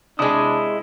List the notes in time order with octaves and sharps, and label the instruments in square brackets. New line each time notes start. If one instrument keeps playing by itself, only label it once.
[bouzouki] C3 G#3 [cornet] D4 [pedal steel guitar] E4 D#6